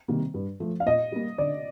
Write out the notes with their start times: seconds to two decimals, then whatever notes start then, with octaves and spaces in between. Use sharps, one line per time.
0.08 C3 D#3 G3 A#3
0.34 G2
0.60 F3 A3
0.80 F5
0.86 A#2 D#5
1.12 G3 A#3
1.38 D3 D5